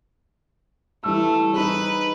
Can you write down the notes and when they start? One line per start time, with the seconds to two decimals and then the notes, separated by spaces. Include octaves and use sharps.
1.04 E3 G3 A3 E6
1.54 D#4 G#4 B4